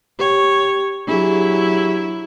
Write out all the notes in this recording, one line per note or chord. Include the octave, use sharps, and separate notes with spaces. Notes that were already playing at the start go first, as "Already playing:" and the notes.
G4 C#5 G5
F#3 D4 E4 G4 G#4